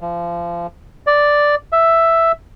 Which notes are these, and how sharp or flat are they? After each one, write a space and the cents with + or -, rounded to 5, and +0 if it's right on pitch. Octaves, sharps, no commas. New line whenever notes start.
F3 -25
D5 +0
E5 +5